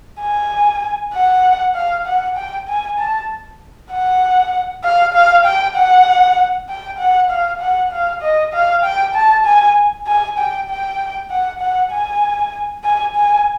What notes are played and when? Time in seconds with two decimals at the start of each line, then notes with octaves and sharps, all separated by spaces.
0.21 G#5
1.14 F#5
1.75 F5
2.07 F#5
2.37 G5
2.69 G#5
2.99 A5
3.92 F#5
4.84 F5
5.14 F5
5.45 G5
5.76 F#5
6.69 G5
6.99 F#5
7.30 F5
7.61 F#5
7.92 F5
8.22 D#5
8.54 F5
8.84 G5
9.15 A5
9.46 G#5
10.07 G#5
10.38 G5
10.69 G5
11.31 F#5
11.61 F#5
11.92 G#5
12.84 G#5
13.16 G#5